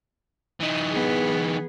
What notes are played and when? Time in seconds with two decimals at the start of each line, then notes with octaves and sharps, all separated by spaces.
0.60 E3 D#4
0.91 B3 G#4